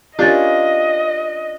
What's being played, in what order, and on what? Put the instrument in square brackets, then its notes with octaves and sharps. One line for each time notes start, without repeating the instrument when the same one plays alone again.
[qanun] A#3 C#4 F4 [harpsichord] D4 [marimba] G4 A6 [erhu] D#5